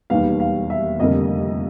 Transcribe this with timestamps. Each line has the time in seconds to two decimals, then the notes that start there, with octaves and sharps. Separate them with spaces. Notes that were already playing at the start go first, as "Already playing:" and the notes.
0.10 E1 D#2 D#3 G3 B3 F5
0.40 F5
0.70 E5
0.99 F1 F2 D3 G3 A#3 D#5